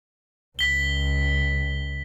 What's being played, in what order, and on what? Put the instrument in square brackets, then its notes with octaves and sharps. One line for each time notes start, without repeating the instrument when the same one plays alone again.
[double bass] C#2 [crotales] B6 G7